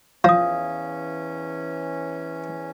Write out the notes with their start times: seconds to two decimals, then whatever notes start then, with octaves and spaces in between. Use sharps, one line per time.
0.24 E2 F3 C#4 F5 D#6